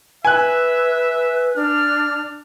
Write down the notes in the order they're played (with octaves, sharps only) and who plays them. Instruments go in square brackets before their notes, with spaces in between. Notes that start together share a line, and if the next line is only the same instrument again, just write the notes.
[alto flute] B4 [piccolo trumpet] E5 [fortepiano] G#5 F#6
[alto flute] D4 [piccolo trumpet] F6